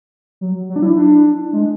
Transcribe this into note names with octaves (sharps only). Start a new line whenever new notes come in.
F#3
F#3
D4
E4
D4
G#3